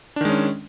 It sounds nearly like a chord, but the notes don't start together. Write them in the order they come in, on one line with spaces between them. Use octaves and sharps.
D4 D#3 G#3 C#4